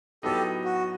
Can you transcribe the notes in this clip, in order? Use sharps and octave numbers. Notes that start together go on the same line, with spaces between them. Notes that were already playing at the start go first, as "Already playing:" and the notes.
A2 F#3 B3 D#4 G4 A4
F#4